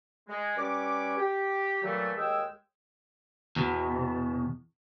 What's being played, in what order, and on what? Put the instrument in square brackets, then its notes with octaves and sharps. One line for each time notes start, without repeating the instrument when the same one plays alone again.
[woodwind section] G#3
G3 C#4 B4 C#5 D6
G4
A#2 E3 F#3 G3 A3
D#2 G#3 G#4 G5 E6
[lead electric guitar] E2 B2